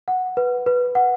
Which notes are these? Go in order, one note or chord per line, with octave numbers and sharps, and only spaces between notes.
F#5
B4
B4
F#5